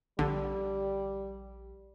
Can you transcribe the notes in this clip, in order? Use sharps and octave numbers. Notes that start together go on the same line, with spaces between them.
A#1 D3 G3